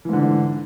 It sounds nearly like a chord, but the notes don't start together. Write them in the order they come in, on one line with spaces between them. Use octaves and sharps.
E3 G#2 D3